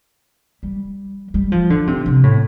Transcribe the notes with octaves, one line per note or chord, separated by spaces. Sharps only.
G3
G3
F3
D3
C3
C3
A2